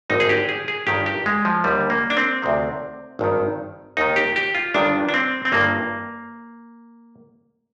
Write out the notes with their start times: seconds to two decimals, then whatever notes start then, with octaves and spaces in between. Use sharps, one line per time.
0.10 G#1 G2 D3 D#4
0.20 G#4
0.29 G4
0.49 G#4
0.68 G#4
0.87 G1 G2 D#3 G4
1.06 G4
1.26 G#3
1.45 F3
1.64 D#2 D3 G3
1.90 A#3
2.10 D4
2.17 C4
2.42 D2 C3 D#3
3.19 G#1 G2 D#3
3.97 D#2 D#3 D#4
4.16 G4
4.36 G4
4.55 F4
4.74 G1 G2 D#3 D4
5.09 D4
5.14 C4
5.45 C4
5.52 G1 G2 D#3 A#3